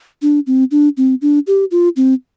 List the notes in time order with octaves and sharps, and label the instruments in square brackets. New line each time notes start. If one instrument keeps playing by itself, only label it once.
[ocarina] D4
C4
D4
C4
D4
G4
F4
C4